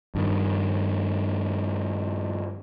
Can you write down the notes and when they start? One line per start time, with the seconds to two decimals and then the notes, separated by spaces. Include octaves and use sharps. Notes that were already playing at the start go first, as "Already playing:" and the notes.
0.15 G2 D#3